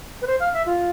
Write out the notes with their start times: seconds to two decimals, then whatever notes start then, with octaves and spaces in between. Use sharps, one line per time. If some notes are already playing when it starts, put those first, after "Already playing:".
0.22 B4
0.27 C5
0.40 F5
0.54 E5
0.66 F4